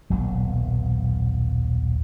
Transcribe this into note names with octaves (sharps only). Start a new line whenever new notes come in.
D#1 B1 F#3